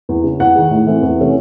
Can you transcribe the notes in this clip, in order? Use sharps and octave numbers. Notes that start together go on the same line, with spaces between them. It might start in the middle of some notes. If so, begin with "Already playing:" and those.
E2
C#3 G#3
E2 F#5
D#3 G#3
A2
E3 A3 C4
E2
C3 E3 A3 C#4